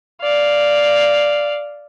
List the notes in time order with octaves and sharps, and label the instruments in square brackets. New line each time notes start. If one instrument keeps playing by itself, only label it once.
[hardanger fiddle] D5 F5